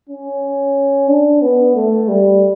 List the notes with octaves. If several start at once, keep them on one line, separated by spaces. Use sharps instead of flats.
C#4
D4
B3
A3
G3